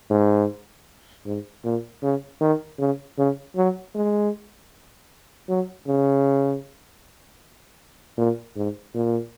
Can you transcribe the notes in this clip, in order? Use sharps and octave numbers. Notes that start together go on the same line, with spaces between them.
G#2
G#2
A#2
C#3
D#3
C#3
C#3
F#3
G#3
F#3
C#3
A#2
G#2
A#2